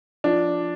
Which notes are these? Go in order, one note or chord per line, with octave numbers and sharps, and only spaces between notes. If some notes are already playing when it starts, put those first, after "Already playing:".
F3 D4